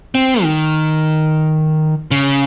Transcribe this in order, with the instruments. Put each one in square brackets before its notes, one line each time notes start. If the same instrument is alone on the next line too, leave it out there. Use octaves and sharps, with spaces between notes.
[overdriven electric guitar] C4
D#3
C#3